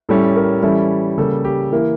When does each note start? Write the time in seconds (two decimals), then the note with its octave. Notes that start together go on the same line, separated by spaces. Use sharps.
0.09 A2 G3 C#4 E4 A4
0.36 A#4
0.63 E3 G3 C#4 E4 A4
1.18 C#3 G3 A#3 A4
1.45 G4
1.72 E3 A#3 E4 A#4